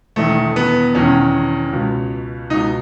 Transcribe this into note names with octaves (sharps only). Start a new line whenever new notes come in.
E1 E2 D#3 A3
B3
E1 E2 D#3 C#4
C#2 B2
C#2 B2 D#4